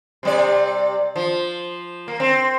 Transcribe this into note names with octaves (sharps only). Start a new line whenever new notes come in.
C3 G3 D5
F3
A#3
C4